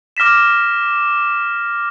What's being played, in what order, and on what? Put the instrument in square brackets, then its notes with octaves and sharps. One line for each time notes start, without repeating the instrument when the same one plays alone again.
[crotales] D6 F6 A#6 B6 E7